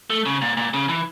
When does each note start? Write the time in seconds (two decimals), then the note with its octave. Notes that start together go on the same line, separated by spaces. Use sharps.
0.10 A3
0.26 C#3
0.42 A#2
0.57 A#2
0.74 C#3
0.89 E3